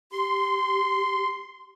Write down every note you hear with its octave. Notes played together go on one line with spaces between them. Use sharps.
G4 C6